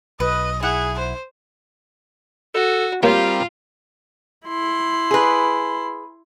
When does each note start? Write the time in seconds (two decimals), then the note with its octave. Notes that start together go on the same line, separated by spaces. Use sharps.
0.20 B1 B4 D#5
0.63 E4 G#4 F#5
0.99 C5
2.54 F#4 A4
3.03 G3 A#3 C4 F4 G4 A#4 C#5 G5
4.47 E4 C6
5.11 G#4 B4